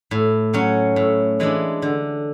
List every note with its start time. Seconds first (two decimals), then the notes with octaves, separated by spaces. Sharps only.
0.11 A2
0.54 F#3 C#4 F#4
0.96 A2
1.40 E3 G#3 D4
1.82 D3